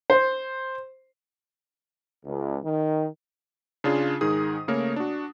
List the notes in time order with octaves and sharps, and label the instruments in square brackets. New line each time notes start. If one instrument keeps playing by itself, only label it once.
[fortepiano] C5
[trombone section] C#2
D#3
[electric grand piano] C#3 D4 F4 G#4
G#2 D#3 D#4 G#4 D#6
C#3 A3 A#3 A#4 C#5
D4 F#4